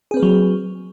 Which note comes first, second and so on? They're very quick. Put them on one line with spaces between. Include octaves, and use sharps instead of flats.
G#4 C4 B4 A#3 F#3